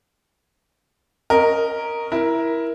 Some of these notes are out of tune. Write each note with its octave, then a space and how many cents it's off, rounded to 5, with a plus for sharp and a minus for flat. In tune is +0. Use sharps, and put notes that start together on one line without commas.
C#4 +0 A#4 +0 D#5 +0
E4 +0 A#4 +15